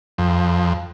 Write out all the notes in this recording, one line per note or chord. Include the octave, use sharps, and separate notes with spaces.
F2